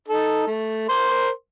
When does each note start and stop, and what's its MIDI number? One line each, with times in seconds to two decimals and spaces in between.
0.08 0.47 63
0.08 0.47 69
0.47 0.88 57
0.89 1.29 70
0.89 1.29 72
0.89 1.29 84